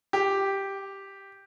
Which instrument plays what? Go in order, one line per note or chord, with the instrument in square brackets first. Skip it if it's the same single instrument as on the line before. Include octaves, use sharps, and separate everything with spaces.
[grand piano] G4